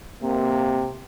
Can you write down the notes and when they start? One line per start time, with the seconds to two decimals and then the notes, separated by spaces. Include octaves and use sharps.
0.22 C3 A#3